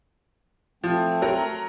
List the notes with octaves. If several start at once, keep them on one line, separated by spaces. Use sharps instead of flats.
F3 A3 C4
F#3 A#4 A#5